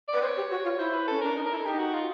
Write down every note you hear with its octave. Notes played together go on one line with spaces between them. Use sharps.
D5
B4
C5 C#5
G4
F#4
F4
E4 C5
B4
C#4 A4
D4 A#4
D#4
A#4
E4
A4
D#4 G4
F#4
F4